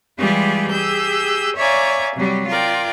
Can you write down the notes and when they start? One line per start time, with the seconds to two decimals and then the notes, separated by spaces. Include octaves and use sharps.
0.18 E3 G3 G#3 F4 G4 G#4
0.70 G4 G#4 E6 G6
1.56 C#5 D5 E5 F5 G#5 A#5
2.15 C3 F#3 G3
2.48 F4 A#4 D5 G5